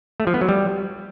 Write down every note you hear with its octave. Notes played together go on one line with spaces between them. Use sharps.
A3
F3
B3
F#3
G3